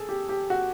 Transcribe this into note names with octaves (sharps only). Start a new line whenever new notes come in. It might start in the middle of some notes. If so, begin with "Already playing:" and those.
Already playing: G#4 A4
G4
G4
F#4